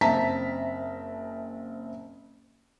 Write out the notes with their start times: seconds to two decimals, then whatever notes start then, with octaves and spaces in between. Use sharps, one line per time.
0.01 F#1 C4 E5 A5 A#5 B6